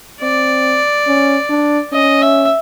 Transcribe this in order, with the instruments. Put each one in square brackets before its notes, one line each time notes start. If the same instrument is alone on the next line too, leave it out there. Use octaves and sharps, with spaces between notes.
[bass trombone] C4 [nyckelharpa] D5
[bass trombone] C#4
D4
[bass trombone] C#4 [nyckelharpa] D#5
[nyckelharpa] E5